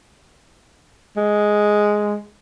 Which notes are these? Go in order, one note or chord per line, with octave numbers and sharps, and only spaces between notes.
G#3